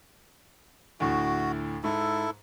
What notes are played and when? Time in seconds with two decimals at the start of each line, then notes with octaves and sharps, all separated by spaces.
1.00 D2 A2 F#4
1.84 G#2 E4 A4